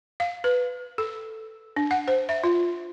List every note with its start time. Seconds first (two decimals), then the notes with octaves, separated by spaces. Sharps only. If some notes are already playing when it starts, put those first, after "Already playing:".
0.20 F5
0.44 B4
0.98 A4
1.76 D4
1.91 F#5
2.08 C5
2.29 E5
2.44 F4